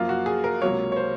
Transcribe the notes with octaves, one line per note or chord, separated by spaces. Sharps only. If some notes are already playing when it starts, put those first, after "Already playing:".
Already playing: F#2 F3 A#3 F4
F#4
G#4
A#4
C#2 C3 F#3 A#3 C#5
C#5
C5